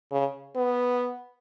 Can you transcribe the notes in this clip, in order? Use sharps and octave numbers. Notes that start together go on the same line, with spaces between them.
C#3
B3